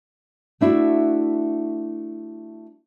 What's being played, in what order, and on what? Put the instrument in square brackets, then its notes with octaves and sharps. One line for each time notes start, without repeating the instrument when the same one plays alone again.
[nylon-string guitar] A3 D4 E4 F#4